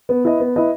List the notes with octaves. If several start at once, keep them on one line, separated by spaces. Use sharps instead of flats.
B3
E4 B4 D#5
B3
E4 B4 D#5